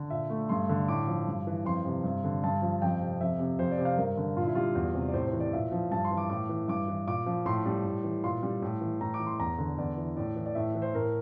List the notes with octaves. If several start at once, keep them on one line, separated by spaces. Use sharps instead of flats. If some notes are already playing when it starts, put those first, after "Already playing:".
Already playing: D3
A#2 E5
A3
G2 C6
D3
A2 D6
F3
G2
E3
F2 C6
C3
G2
D3
G2 A5
F3
F2 G5
C3
F2 E5
C3
F2 C5
D5
C3
F5
G2 A#4
D3
A#2 F4
E4
G3 F4
E2
C3
D5
A2 C5
C5
E3
D5
A#2 E5
F3
G2 A5
C6
E3
D6
A2 D6
E3
G2 D6
E3
A#2 D6
F3
A2 C6
G3
A2
E3
A#2 C6
G3
A2
E3
A2 A#5
D6
E3
C6
E2 A#5
D3
E2 D5
E3
A2 D5
E3
D5
A2 E5
E3
C5
A2 A#4